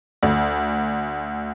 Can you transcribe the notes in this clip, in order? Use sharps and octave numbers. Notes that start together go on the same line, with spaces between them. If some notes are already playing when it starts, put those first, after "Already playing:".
D2